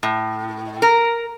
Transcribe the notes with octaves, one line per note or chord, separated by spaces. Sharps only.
A2
A#4